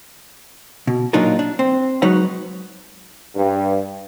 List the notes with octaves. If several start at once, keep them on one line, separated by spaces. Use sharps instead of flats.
B2
A#2 F#3 D4 D#4 F4 A#4
D4
C4
F#3 G#3 D#4 B4 C#5 F#5
G2